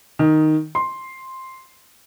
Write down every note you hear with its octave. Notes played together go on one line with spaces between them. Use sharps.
D#3
C6